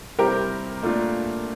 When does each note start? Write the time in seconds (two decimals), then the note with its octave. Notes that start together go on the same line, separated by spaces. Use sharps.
0.18 C3 G3 C4 E4 G4 A#4
0.83 A#2 A3 D4 F4